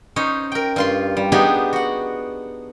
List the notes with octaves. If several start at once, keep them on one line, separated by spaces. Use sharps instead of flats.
C#4 D#4 C5 C#5
A#4 G5
G2 F4 C6
G3
B3 D4 D#4 G4 G#4 B4
F#4 F#5